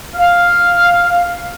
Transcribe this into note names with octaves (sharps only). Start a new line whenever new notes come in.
F5